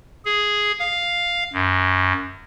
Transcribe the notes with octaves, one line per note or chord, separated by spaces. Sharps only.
G#4
F5
F#2